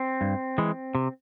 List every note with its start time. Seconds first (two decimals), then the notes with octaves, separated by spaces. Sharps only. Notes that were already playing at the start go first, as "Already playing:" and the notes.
Already playing: C4
0.21 G2
0.58 E3 G#3
0.95 C3